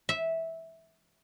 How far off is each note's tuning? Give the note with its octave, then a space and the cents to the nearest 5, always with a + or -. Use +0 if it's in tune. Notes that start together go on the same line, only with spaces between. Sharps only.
E5 -10